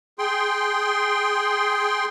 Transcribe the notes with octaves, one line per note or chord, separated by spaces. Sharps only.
G#4 G5 C6